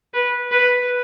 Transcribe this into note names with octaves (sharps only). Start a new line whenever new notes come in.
B4
B4